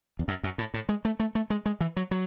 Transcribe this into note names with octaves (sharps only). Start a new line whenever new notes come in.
E2
F#2
F#2
A2
A2
G#3
A3
A3
A3
G#3
G#3
E3
F#3
F#3